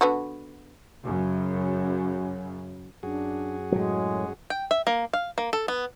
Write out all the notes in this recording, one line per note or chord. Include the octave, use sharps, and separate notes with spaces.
D3 B3 F#4
F#2 C#3
F#2 D4 F#4 G#4
A2 F#3 G#3
G5
E5
A#3
F5
A#3
A4
B3